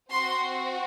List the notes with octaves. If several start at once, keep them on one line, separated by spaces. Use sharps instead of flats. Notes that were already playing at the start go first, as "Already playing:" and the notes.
C4 F#4 C6